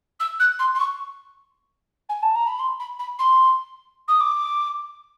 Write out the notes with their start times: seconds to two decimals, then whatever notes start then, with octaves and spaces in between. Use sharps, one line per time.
0.19 E6
0.39 F#6
0.59 C6
0.74 C6
0.79 C#6
2.09 G#5
2.22 A5
2.35 A#5
2.47 B5
2.59 C6
2.79 B5
2.99 B5
3.19 C6
4.08 D#6
4.20 D6